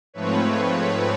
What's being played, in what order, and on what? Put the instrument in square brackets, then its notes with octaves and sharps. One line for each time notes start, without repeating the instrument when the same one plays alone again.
[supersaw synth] G#2 F3 A3 C4 B4 C#5